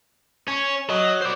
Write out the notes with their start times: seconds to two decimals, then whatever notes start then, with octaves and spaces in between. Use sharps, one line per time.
0.48 C#4 C#5
0.90 F#3 D#5
1.21 C5 D5